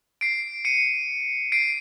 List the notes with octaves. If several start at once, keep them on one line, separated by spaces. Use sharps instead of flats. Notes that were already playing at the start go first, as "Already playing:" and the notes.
C7 D7
C#7 D#7
C7 D7